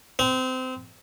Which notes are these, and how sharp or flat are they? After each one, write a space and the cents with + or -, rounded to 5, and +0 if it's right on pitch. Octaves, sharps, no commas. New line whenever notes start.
C4 -25